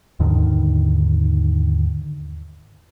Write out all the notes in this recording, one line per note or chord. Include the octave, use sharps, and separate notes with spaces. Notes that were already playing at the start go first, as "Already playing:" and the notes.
D#2 G#2 D3 D#3